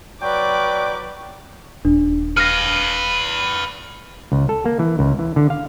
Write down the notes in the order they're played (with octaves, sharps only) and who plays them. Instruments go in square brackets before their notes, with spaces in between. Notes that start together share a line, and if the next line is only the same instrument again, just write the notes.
[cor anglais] F#3 [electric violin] B4 D6 [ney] D5 [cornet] G5
[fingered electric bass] D#1 [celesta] D4
[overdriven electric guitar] B4 F5 [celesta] F6 A#6
[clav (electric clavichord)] C#2
A4
A#3
E3
C#2
E3
D3
F5